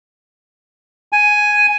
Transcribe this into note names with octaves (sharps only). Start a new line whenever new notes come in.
G#5